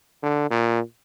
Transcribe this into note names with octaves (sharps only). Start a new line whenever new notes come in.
D3
A#2